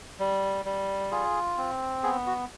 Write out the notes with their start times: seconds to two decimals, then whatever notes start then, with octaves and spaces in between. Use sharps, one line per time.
0.20 G3
0.65 G3
1.11 F4 G#4
1.57 C4
2.03 B3 G#4
2.27 F#4